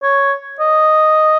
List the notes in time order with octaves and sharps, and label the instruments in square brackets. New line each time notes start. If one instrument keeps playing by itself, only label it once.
[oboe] C#5
D#5